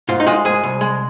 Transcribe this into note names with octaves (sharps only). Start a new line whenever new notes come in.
G#2 F4
D#4
G#3 F4
G#2 G#4
C2
G#3